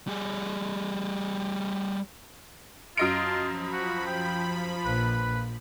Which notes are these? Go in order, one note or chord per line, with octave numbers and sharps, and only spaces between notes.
G3 G#4
F#2 F4 D#5 A5 D7
F3 B5
F#4
G5
A#1 B4